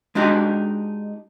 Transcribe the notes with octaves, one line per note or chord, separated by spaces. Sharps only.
G#3 D4 D#4 F#4 G4 A#4